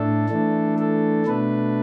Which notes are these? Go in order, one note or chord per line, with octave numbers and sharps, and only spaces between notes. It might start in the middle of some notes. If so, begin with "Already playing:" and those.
Already playing: A2 A3 D4 A4
E3 A3 D4
A4
B2 A3 D4 B4